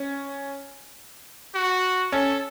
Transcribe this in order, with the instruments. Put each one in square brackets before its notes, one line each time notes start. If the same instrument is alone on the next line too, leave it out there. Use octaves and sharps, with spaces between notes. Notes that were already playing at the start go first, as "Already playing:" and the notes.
Already playing: [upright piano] C#4
[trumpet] F#4
[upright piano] C#4 [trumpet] A4